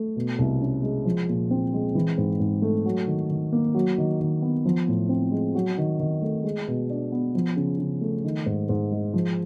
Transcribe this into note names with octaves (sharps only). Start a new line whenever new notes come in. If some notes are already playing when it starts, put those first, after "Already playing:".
Already playing: A3
B2
C2
C#4
G#3
F3
A#2
C4
G#3
E3
G#2
G#2
A3
F#3
D#3
D#3
A#3
F#3
D#3
D#3
B3
F3
A2
C4
G#3
F#3
D#3
D#3
A3
G#3
B2
D4
B3
F3
C#3
C#3
A3
D#3
G#2
G#2
G#3
F3